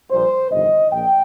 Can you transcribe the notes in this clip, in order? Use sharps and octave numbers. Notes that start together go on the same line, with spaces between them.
A#1 A#2 G3 C5
G1 F2 C3 D#3 D#5
A#1 A#2 G5